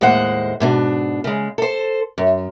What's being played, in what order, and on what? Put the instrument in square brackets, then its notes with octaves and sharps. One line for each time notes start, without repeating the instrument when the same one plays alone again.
[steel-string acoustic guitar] D#2 A2 G#3 C5 F#5
G#2 B2 D4
C#3 G#3
A4 C5
F#2